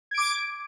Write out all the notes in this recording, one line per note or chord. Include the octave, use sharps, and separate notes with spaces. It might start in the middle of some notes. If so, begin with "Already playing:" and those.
D6 G#6 D7